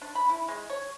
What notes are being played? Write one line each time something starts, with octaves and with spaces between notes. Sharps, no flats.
D4
B5
E4
G#3
C#5